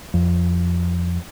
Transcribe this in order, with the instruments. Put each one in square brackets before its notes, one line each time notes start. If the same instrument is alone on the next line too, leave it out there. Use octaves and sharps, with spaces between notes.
[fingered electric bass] F2